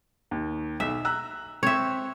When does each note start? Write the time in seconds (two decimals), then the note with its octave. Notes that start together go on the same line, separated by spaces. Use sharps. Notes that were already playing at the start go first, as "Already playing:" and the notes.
0.31 D#2
0.80 B1 E5
1.05 A#5 E6 F#6
1.63 C4 C#5 E5